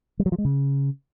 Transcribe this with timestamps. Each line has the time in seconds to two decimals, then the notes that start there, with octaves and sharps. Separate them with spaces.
0.19 G3
0.26 F#3
0.32 F3
0.38 G#3
0.45 C#3